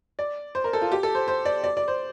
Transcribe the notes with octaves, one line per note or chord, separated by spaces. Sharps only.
D5
C5
A#4
A4
F4
G4
A4
C5
C5
D5
D5
D5
C5